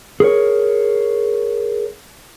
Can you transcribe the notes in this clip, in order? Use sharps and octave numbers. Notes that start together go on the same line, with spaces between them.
G#4 A#4 C#5